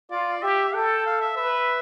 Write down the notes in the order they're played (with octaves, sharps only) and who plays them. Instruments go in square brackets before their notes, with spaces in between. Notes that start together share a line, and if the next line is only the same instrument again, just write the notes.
[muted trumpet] F4 [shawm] D5
[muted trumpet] G4 [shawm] E5
[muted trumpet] A4 [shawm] G5
[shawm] F5
E5
[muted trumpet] B4 [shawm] E5